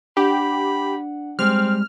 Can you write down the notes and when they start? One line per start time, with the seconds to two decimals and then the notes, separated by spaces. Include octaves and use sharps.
0.17 D4 G4 F#5 B5
1.39 G3 G#3 C4 F6